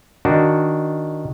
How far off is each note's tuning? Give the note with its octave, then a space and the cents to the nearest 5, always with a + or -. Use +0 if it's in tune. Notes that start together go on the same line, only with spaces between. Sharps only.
D#3 +0 D4 +0 F#4 +0